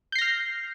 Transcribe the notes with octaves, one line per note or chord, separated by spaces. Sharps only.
F6 G6 A#6 C7